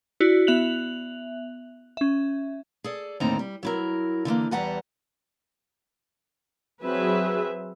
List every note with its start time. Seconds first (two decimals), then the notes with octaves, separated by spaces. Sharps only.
0.20 E4 F#4 D5
0.47 B3 E5 F#6 F7 F#7
1.97 C#4 E5
2.84 G#4 A4 D5
3.20 D#2 A2 D3 C4 D#4 A#5
3.39 G3
3.63 F#3 E4 A#4
4.25 D3 E3 A3 A#3
4.51 E2 E3 G3 F#5 A5 A#5
6.84 F#3 C4 G#4 B4 E5